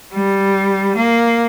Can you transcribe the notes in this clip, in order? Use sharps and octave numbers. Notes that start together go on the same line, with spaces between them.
G3
A#3